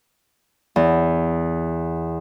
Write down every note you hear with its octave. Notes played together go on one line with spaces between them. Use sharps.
E2